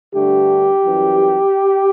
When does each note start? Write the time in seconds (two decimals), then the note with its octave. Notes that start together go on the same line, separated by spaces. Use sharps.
0.14 G2 D3 A3 G4
0.84 F#2 E3 G3